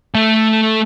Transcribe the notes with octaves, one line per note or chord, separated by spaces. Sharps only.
A3 A4